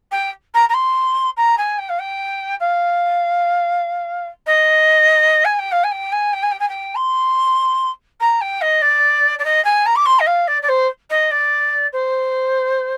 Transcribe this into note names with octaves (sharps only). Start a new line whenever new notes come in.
G5
A#5
A#5
C6
A#5
G#5
G5
F5
G5
F5
D#5
G#5
G5
F5
G#5
G5
G#5
G5
G#5
G5
G#5
G5
C6
A#5
G5
D#5
D5
D5
D#5
G#5
A#5
D6
C6
D#5
F5
D5
D5
C5
D#5
D5
C5